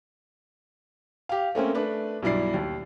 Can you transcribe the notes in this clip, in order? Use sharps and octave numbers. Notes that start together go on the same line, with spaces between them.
G4 F5
A3 A#3 C4 C#4
A3 D4 B4
B1 G2 E4 D5 C7
D#2